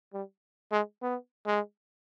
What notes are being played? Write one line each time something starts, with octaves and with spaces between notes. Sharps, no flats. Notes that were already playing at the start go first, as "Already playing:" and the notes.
G3
G#3
B3
G#3